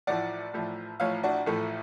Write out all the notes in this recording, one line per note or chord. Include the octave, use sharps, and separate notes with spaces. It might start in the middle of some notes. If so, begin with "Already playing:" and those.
A1 A2 F3 D5 F#5
A1 A2 F3
A1 A2 F3 C#5 F5
D4 F#4
A1 A2 F3 A3